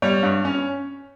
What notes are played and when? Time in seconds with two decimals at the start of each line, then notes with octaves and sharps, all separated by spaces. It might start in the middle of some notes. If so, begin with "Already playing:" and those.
0.02 G3 C#5
0.23 G2
0.45 C#4